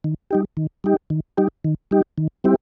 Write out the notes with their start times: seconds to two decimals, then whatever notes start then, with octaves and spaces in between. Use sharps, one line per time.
0.04 D#3
0.31 G3 D#4 G4
0.57 D#3
0.84 G3 D#4 G4
1.10 D#3
1.37 G3 D#4 G4
1.64 D#3
1.91 G3 D#4 G4
2.18 D#3
2.44 G3 C4 E4 G4